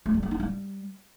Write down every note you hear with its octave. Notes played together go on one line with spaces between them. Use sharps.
A3
G3
A#3
D#4
G3